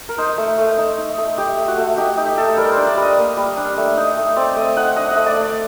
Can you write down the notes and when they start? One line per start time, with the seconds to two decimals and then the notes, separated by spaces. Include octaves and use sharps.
0.09 A#4
0.18 D#4 C5
0.38 A3
0.58 A3
0.78 D#4
0.98 D#4
1.18 A3
1.38 D#4 G4
1.57 A3
1.68 F#4
1.77 A3
1.97 D#4 G4
2.17 D#4 G4
2.37 A3 A4
2.57 G3 A#4
2.72 D4 C5
2.87 D5
2.97 G3
3.02 D#5
3.17 A#3
3.37 G3
3.57 D4
3.77 A3
3.97 D#4
4.17 A3
4.36 C4 D5
4.56 A3 D#5
4.76 D#4 F#5
4.96 D4 D#5
5.11 A3 D#5
5.26 D5
5.36 A3 D5